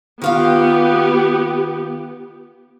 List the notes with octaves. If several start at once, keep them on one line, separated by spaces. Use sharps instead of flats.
D#3 B3 F4 G4 F5